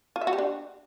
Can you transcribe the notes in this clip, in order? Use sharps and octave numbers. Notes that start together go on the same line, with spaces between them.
F4
E5
F#4
G4
D4